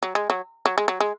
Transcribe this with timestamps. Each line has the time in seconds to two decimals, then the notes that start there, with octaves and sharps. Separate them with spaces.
0.03 F#3
0.15 G#3
0.30 F#3
0.66 F#3
0.78 G#3
0.88 F#3
1.00 G#3